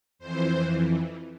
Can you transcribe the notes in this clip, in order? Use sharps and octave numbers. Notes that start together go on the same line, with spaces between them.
F2 E3 C5